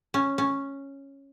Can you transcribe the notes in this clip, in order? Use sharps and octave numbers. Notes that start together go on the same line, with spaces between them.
C#4
C#4